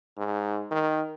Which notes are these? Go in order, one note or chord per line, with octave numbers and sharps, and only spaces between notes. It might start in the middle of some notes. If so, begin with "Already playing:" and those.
G#2
D#3